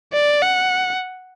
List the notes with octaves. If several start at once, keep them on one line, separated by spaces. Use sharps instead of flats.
D5
F#5